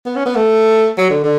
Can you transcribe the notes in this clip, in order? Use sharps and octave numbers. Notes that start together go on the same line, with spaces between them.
B3
C#4
B3
A3
F#3
D3
D3